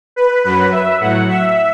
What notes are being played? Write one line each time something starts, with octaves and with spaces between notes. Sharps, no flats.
B4
F#2 F#3 B4
E5
A2 F#3 F#5
E5